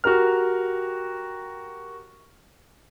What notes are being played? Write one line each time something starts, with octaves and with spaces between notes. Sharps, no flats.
F#4 G4 A#4 F6